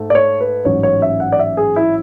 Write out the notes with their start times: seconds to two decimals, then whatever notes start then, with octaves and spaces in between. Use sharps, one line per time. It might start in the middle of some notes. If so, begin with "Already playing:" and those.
Already playing: G#2 A3
0.10 D5
0.15 C#5
0.41 B4
0.65 A1 G#2 F#3 C#4 C#5
0.83 C#5
1.02 E5
1.20 F#5
1.32 D5
1.39 E5
1.57 G#4
1.76 E4